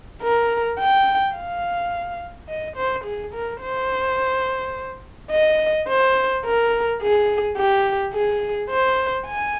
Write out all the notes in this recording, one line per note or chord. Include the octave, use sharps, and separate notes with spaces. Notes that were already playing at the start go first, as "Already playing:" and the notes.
A#4
G5
F5
D#5
C5
G#4
A#4
C5
D#5
C5
A#4
G#4
G4
G#4
C5
G#5